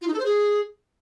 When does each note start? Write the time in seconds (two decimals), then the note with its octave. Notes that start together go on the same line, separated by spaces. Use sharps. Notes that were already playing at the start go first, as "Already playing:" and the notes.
0.02 F4
0.07 D#4
0.13 A4
0.19 C5
0.25 G#4